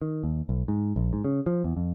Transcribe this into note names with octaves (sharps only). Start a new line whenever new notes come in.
D#3
D#2
B1
G#2
A#1
G#2
C#3
F3
E2
F2